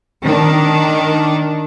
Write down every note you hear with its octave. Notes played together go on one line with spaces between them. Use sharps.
D#3 D4